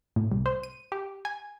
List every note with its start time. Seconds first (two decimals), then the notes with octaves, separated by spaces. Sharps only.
0.16 A2
0.32 C2
0.46 C5
0.63 D#7
0.92 G4
1.25 G#5